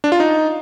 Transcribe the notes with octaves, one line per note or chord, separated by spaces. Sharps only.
D4
F4
D#4